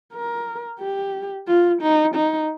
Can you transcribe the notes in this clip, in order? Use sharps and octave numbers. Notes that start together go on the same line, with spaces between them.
A#4
G4
F4
D#4
D#4